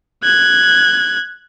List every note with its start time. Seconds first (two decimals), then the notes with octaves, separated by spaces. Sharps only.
0.24 F#6 G#6